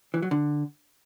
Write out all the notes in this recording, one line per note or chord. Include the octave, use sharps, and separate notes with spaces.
E3
F#3
D3